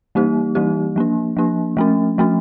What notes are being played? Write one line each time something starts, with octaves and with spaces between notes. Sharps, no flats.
E3 G3 A#3 D#4 G4
E3 G3 A#3 D#4 G4
F3 A#3 D4
F3 A#3 D4
F3 A3 C#4
F3 A3 C#4